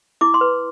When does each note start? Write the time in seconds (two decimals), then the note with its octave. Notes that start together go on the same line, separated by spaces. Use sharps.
0.21 E4 D6
0.34 C6
0.41 B4